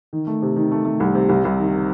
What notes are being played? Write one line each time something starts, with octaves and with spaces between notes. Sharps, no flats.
D#3
A3
C3
D#3
A3
A3
C2
C3
C2
C2
D#3